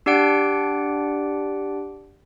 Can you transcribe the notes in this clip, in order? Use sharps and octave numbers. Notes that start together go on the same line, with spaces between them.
D4 G4 D5 F#5 D7